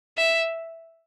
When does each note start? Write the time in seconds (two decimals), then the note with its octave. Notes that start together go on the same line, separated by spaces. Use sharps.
0.17 E5